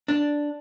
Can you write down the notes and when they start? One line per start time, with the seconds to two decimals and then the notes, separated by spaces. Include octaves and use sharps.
0.08 D4